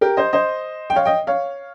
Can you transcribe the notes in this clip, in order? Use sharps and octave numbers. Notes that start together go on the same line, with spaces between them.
G4 A#4
C5 D#5
C5 D#5
G5
C#5 F5
D#5 G5
C#5 F5